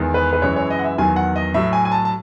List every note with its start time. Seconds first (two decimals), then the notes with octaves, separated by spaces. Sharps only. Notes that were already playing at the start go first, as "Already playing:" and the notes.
Already playing: E2 D#3 G#3
0.14 B4
0.33 B4
0.42 F#2 E3 G#3 C#5
0.56 C#5
0.70 D#5
0.79 F#5
0.84 E5
0.98 E2 D#3 F#3 G#5
1.16 F#5
1.36 D#5
1.54 A2 F#3 E5
1.73 G#5
1.85 G#5
1.92 A5
2.05 A5